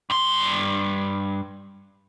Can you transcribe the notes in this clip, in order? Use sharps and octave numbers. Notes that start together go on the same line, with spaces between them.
G2 C6